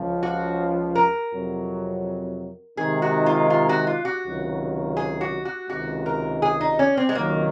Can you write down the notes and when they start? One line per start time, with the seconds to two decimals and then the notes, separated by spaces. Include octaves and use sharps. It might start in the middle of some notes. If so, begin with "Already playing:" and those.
Already playing: C#2 C#3 F3
0.23 F#4
0.95 A#4
1.31 F2 C3 F#3
2.77 C3 D#3 G#3 D#4 G#4
3.02 F#4
3.26 F4
3.50 F4
3.69 F#4
3.87 F4
4.05 F#4
4.24 C#2 C3 D#3 F#3
4.97 G#4
5.21 F#4
5.45 F#4
5.69 C#2 C3 D#3 G#3 F#4
6.06 A#4
6.42 G#4
6.61 D#4
6.79 C#4
6.97 C4
7.09 G#3
7.15 C#2 C3 D#3 F#3 A#3